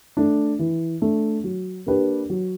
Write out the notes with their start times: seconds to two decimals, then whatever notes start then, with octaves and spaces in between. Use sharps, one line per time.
0.17 A3 D4
0.59 E3
1.02 A3 D4
1.44 F#3
1.86 A#3 D4 G4 B4
2.30 F#3